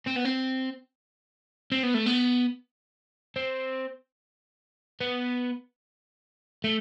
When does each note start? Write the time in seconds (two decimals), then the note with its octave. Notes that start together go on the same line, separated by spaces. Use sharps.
0.07 C4
0.17 B3
0.25 C4
1.72 C4
1.83 B3
1.94 A3
2.06 B3
3.36 C4
5.01 B3
6.64 A3